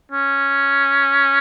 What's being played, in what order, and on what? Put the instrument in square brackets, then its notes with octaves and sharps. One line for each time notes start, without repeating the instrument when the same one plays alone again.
[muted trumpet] C#4